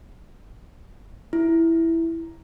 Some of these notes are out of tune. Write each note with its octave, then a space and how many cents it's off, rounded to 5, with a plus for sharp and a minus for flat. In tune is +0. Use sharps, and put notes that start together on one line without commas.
E4 +0